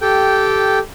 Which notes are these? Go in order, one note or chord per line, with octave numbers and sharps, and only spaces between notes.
G4 A4 G5